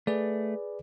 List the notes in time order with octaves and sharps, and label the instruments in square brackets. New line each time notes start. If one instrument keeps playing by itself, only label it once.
[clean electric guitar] A3 [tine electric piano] G#4 B4 D5